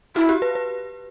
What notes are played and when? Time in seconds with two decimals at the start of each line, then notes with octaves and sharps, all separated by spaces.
0.16 E4 F#4
0.29 G4
0.42 B4
0.55 B4